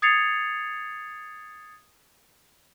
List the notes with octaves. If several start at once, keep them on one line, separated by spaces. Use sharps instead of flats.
D#6 G#6 A6 C7 C#7 F7